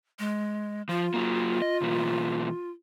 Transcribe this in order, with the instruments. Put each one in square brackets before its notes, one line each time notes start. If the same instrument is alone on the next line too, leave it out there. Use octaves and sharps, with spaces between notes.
[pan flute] G#3
[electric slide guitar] F3 [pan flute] F4
[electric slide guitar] F#3 A#3
D#5
B2 E3 A#3